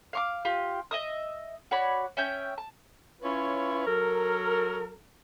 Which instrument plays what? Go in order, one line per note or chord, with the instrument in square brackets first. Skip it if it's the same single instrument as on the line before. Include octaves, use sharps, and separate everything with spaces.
[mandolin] F5 C#6 D6
F4 G4
D#5 E5 D#6
F#4 C#5 D5 B5
C#4 E5 G5 G6
A5
[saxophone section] C#4 E4 F4 B4 C#5
F#3 A4 A#4